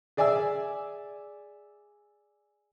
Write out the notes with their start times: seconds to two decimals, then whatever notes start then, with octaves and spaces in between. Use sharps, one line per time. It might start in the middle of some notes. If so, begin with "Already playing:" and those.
0.17 G#4 D5 E5 G#5 E6